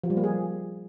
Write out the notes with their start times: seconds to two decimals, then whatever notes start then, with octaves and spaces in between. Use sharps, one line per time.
0.04 F3
0.10 G3
0.17 A#3
0.24 G#4